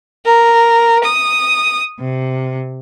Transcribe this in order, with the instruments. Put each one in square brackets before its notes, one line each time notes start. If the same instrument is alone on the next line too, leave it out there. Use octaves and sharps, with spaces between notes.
[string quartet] A#4
D#6
C3